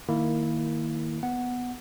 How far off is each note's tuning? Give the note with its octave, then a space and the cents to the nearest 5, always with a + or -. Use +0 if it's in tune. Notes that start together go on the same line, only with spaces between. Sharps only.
D#3 +0 A#3 -10 E4 -10
B3 +0 F#5 +0